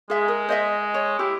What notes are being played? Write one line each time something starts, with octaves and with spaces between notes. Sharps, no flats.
G#3 G#4 E5
A#4
C5 D#5 E5
C#5
E4 G4